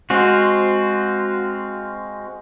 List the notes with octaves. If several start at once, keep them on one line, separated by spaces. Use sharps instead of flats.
G#3 C4 F4 F#4